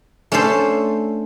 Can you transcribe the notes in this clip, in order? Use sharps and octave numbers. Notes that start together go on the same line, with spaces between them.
A3 C#4 D4 A4 C5